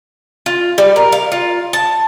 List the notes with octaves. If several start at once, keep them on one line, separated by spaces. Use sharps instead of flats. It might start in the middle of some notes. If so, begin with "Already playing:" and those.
F4
G3
A#4
F5
F4
A5